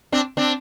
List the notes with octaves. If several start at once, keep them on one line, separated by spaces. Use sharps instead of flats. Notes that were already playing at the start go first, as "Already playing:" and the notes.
C4 D4
C4 D4